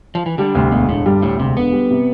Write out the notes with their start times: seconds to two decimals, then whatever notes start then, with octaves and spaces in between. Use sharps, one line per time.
0.15 F3
0.26 E3
0.38 D3 G3
0.55 D2 C3
0.71 E1 B2
0.89 A2 D3
1.06 G2 G3
1.22 D2 A2
1.39 E1 C3
1.56 D3 B3
1.73 G3
1.91 C3